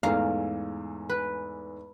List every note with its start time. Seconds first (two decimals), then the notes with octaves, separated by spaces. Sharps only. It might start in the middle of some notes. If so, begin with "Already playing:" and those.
0.03 E2 G#2 A3 F5 A#5
1.09 B4